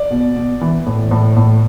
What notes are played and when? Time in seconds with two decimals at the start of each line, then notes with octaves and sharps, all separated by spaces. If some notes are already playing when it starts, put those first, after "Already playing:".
Already playing: D5
0.11 B2
0.36 B2
0.61 E3
0.86 A2
1.11 A2
1.36 A2